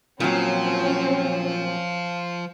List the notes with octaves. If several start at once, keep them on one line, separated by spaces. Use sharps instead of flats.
A#2 F3 F#3 C4 C#4